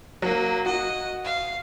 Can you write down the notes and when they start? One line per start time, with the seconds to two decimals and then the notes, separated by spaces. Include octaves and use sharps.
0.22 F#3 A#3
0.66 F#4 D#5
1.24 F5